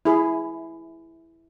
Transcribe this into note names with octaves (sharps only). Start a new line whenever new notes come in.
E4 G#4